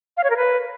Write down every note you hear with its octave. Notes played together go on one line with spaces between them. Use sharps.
F5
C#5
A#4
B4